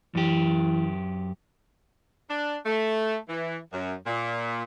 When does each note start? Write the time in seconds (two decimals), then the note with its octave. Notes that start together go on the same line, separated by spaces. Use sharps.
0.15 F#2 E3 G4
2.30 D4
2.66 A3
3.29 E3
3.73 F#2
4.07 A#2